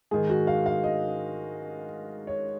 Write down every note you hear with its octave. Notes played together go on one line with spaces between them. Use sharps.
G#2 D#3 G#4
F#4
F5
F5
D#5
C#5